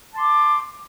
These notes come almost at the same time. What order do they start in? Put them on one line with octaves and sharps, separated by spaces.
A5 C6 D6